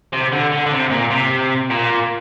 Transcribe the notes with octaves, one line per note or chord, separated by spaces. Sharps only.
C3
D3
D3
D3
C3
A#2
C3
A#2